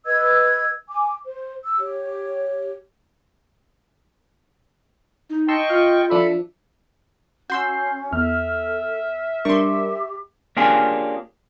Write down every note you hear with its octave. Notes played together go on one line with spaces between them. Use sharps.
B4 D#5 E6 G#6
G#5 D6
C5
E6
G4 C#5
D#4
D#5 G5 A5 C6 C#6 E6
F4 F5
F3 D4 A4 E5 B5
C#4 F#4 C6 E6 G6 C7
E2 A4 E5 F6
G3 D4 G4 A#4 C6 C#6
A#3 C#4 D4 F4 G4 G#4